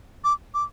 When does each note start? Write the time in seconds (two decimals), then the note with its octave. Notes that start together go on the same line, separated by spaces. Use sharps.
0.24 D6
0.54 D6